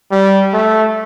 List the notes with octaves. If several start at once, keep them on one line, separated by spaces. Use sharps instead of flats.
G3
A3